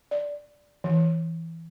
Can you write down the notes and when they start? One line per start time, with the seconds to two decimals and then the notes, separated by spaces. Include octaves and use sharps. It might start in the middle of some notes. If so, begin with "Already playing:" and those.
0.11 D5
0.84 E3